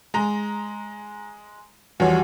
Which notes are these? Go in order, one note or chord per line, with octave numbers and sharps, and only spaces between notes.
G#3 A#5
E2 F3 G3 F#4 C#5